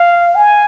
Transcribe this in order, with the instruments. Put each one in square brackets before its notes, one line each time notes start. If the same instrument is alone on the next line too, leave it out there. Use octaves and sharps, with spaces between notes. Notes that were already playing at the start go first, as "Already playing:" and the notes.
Already playing: [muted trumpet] F5
G#5